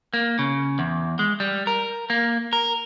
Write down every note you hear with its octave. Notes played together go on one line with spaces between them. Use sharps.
A#3
C#3
E2
G#3
G3
A#4
A#3
A#4